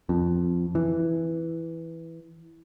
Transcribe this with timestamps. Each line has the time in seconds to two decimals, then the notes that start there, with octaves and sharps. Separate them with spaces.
0.09 F2
0.75 E3